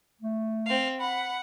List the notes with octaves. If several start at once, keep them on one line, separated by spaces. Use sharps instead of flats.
A3
C4 F5
F#5 B5